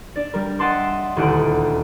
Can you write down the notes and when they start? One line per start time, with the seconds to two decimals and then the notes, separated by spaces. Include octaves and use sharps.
0.15 D4 D5
0.34 G3 A#4
0.59 D#5 E5 F#5 A5 C6 D6
1.17 D#1 D2 E4 G4 F#5 D7